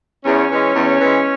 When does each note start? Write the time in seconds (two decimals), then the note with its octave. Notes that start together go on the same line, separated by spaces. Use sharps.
0.24 E2 C#4
0.50 E3 G#3
0.74 E2
1.01 E3 G#3